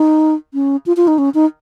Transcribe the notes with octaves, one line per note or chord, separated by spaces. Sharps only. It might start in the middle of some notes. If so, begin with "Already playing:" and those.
Already playing: D#4
C#4
F4
F4
D#4
C#4
D#4